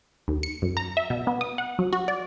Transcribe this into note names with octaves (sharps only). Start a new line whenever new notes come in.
D#2
C#7
F#2
A#5
E5
B2
B3
D#6
F#5
F#3
F#4
D5